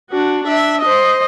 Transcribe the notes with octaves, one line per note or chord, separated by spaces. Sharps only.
D4 F#4
D4 E5
C5 D#5